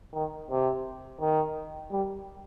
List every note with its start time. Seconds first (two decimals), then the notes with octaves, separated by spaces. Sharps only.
0.14 D#3
0.50 C3
1.20 D#3
1.91 G3